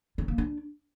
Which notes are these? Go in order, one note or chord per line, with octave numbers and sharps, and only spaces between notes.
C#4
A#3
D4